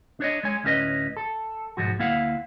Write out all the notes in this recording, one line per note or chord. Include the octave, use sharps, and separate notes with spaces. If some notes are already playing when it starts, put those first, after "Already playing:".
D4 C#5 D#5
G#3 C#5 G#5
D2 A2 C#4 G4 B4 D#5
A4
B1 G#2 F3 F#4
D2 A#3 E4 F5 F#5